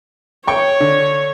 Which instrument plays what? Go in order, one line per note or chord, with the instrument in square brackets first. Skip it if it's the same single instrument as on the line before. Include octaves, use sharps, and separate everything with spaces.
[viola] C#5 [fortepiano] G5 C#6
[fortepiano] D3